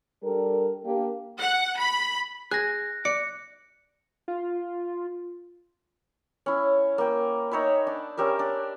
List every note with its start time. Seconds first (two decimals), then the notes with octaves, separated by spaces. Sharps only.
0.24 G3 D4 A4 A#4
0.84 A#3 D4 G4
1.40 F#5
1.79 B5
2.51 G#4 F#6 A#6
3.05 D5 C#7
4.28 F4
6.46 C#4 E4
6.98 A#3 G5
7.51 D#4 C#5 E5 B5
7.87 D4
8.17 C#4 G4 A#4 E5
8.39 D4